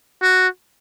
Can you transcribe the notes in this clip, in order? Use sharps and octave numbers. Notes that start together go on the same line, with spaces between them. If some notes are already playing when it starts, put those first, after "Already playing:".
F#4